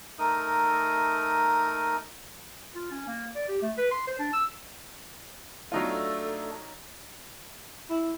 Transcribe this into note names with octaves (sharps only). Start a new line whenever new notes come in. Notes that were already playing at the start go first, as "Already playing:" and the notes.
A3 D#4 A#4 D#6
F4
C#4
A#3
D5
G4
A3
B4
C6
C5
D4
E6
F#3 A3 D4 D#4 F4 A4
E4